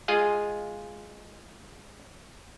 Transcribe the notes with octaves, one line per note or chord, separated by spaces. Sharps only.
G#3 F4 G#4 D#5 F5